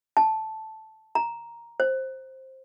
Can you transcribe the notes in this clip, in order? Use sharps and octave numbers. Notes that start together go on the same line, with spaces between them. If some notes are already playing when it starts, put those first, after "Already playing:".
A5
A#5
C5